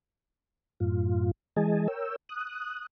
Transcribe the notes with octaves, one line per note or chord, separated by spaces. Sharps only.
F#2 A2 F4
E3 G#3 G#4 D#5 G#5 A5
A#4 C#5 G5 E6
D#6 F#6